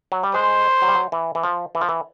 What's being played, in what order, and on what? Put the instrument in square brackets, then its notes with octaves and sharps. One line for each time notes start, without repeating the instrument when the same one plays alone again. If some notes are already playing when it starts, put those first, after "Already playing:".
[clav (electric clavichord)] F#3
G3
[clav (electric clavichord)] G#3 [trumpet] C5
[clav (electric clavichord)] F#3
G3
F#3
E3
E3
F3
E3
F3
E3